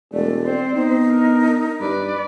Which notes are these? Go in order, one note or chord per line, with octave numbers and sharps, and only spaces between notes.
E1 A3 D5
C4 C5
B3 D#4
D4 A#4
G2 B4 D5